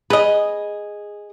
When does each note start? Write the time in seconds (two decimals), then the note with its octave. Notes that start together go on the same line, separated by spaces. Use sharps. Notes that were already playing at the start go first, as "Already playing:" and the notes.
0.10 G#4 B4 D#5